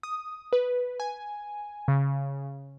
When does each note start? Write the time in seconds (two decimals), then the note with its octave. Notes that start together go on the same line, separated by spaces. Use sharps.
0.03 D#6
0.53 B4
1.00 G#5
1.88 C#3